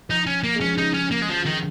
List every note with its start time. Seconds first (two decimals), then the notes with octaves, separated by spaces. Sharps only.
0.09 F3 D#4
0.26 C#4
0.44 A#3
0.55 G#3
0.61 F3 C#4
0.78 C#3 D#4
0.94 C#4
1.12 A#3
1.22 G#3
1.30 F3
1.46 D#3